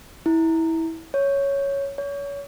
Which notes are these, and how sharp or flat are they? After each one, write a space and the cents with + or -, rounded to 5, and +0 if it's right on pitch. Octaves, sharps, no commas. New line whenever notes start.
E4 -20
C#5 +0
C#5 +30